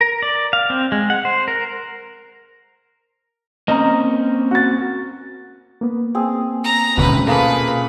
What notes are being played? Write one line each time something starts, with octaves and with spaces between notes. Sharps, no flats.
A#4
D5
F5
C4
G#3
F#5
C5
A#4
A#3 C4 C#4 D#5 A#5
F#4 A6
A#3 B3
C4 G#4
A#5
D#1 D2 G#2 B2 C#4 B4
A#2 A3 A#3 G#4 B4